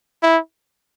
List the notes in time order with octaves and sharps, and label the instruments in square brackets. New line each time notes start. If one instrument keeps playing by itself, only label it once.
[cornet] E4